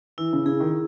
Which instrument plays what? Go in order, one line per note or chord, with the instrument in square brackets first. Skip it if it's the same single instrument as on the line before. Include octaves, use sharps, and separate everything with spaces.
[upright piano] E3 [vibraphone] E4
[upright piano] C#3
[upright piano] C#3 [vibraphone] G#4
[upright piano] D#3